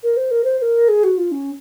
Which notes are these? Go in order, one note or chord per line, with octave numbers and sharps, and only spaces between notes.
A#4
C5
A#4
C5
C5
A#4
G#4
F#4
F4
C#4